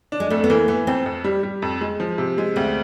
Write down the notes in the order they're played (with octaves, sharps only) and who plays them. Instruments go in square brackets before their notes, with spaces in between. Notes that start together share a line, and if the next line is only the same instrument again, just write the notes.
[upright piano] D4
[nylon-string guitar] G#3
[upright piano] F2 [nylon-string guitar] A3
[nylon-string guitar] B3
[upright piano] E3 [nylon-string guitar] A#3
[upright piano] E3 [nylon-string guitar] B3
[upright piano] F2 [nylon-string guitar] C4
[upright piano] F2
G3
G3
F2
G#3
F3
C3
G#3
[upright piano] D2 [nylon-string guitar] C4